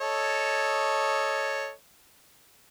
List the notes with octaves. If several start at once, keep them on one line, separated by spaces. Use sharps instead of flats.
A4 C#5 D#5